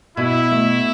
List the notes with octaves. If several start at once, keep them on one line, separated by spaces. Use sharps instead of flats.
B2 E4
A3